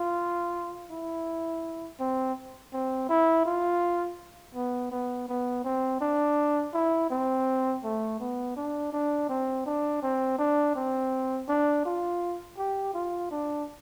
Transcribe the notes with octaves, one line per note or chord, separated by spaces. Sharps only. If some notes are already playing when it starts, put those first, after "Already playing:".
Already playing: F4
E4
C4
C4
E4
F4
B3
B3
B3
C4
D4
E4
C4
A3
B3
D4
D4
C4
D4
C4
D4
C4
D4
F4
G4
F4
D4